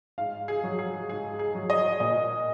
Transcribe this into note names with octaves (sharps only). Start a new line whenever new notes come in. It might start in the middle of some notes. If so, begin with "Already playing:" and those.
G#2 F5
G#4
F#3
G#4
G#2 G#4
G#4
F#3
D#5
A#2 D#5